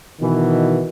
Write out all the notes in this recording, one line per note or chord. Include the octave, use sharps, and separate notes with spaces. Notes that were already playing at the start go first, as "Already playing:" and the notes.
B2 D#3 E3